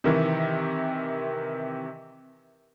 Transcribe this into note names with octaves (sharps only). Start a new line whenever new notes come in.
C3 D#3 E3